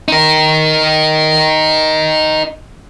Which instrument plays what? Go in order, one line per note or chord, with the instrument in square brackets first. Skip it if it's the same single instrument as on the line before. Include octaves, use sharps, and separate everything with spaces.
[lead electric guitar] D#4 A#4